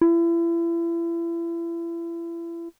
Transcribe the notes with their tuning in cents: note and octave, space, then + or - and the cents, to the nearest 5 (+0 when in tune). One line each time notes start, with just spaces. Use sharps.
E4 +35